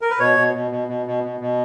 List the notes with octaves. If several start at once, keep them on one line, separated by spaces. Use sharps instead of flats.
A#4
B4
B2 C#5
B2
B2
B2
B2
B2
B2
B2